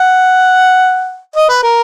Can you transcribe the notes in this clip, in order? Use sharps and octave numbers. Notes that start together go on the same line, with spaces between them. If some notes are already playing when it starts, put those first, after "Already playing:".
Already playing: F#5
D#5
B4
A#4